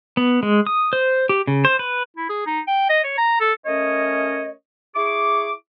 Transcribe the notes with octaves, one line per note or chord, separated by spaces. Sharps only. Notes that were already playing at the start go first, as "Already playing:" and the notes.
B3
G#3
D#6
C5
G4
C#3
C5
B4
E4
G#4
D#4
G5
D#5
C#5
A#5
A4
A3 C#4 A#4 C#5 D#5
E4 G#4 C#6 D6